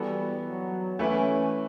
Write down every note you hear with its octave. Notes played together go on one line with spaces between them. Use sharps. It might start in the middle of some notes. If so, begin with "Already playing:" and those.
Already playing: E3 G3 B3 F#4 A4
F#3
E3 A3 C#4 E4 B4